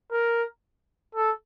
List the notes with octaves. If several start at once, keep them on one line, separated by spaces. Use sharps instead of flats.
A#4
A4